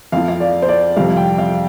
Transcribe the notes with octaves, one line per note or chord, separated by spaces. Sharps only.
F2 F3 F5
F5
D5
C5
D5
F2 C3 G3 F5
G5
F5